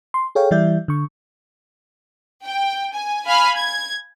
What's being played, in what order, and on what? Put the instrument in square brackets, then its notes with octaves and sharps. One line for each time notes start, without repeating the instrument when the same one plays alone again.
[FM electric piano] C6
G#4 A4 C#5 F5 G5
E3 G3 E4 D5 E5 G6
D3 C#6
[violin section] G5
G#5
F5 G#5 B5 F6
G#6